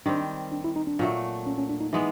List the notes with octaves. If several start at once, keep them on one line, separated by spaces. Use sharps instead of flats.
D#3 G3 C4 D4
D4
E4
D#4
D4
A#2 F#3 A3
C#4
C#4
D4
D#4
E3 G#3 B3 D#4